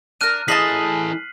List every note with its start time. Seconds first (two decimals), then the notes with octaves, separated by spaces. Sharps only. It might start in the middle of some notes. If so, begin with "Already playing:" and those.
0.21 D4 A#4 F6 F#6 D#7
0.48 E3 G#4 A4 D#5 A5 B6 C7 F#7